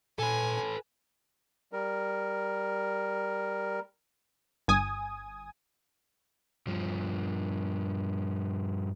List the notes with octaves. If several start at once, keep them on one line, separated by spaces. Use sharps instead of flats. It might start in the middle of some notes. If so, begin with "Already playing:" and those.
A#2 A4 B4 G#5
G3 A#4
G1 G#5 D#6
G2 F3